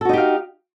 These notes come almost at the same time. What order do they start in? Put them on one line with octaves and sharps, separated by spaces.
A4 F#4 D#4 G4 F5